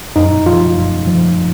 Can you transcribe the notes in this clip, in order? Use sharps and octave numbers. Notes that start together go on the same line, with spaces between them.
F#2 D#4
F3 F4
F#2
F3